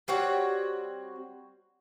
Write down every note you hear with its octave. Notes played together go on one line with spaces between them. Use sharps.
G3 C4 F#4 C#5